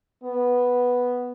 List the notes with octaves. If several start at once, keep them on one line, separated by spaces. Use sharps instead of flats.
B3